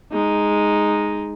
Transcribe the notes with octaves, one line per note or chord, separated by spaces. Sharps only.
G#3 D#4